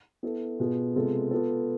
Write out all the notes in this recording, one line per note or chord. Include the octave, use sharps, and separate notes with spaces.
B3 E4 A4
B2 B3 F4 G#4
C3 G#3 B3 F4 A4
B3 F4 A4